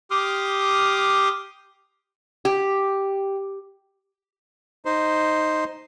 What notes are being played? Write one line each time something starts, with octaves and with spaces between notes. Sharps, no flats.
G4 C6 D6 D#6 F6
G4
D#4 C5